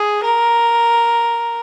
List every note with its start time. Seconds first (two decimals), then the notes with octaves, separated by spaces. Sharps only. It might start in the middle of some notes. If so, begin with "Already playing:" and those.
Already playing: G#4
0.24 A#4